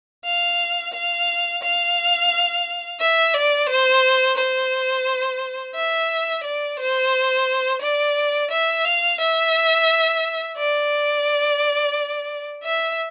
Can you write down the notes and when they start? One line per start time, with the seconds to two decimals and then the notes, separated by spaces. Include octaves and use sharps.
0.25 F5
0.93 F5
1.63 F5
3.00 E5
3.34 D5
3.69 C5
4.37 C5
5.75 E5
6.43 D5
6.79 C5
7.81 D5
8.51 E5
8.85 F5
9.20 E5
10.57 D5
12.63 E5